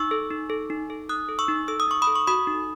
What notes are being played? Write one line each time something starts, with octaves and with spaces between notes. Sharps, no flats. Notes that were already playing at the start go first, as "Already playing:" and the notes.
Already playing: D#4 C#6 E6
A4
D#4
A4
D#4
A4
D#4 D#6 F#6
A4
C#6 E6
D#4
A4 E6
D#6
D#4 C#6
B5 D#6
A4
C#6
F#4 B5 D#6
D#4